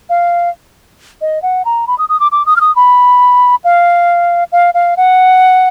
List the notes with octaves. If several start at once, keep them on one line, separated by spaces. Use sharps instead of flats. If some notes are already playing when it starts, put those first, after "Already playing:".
F5
D#5
F#5
A#5
B5
D#6
D#6
D6
D6
D#6
F6
D#6
B5
F5
F5
F5
F#5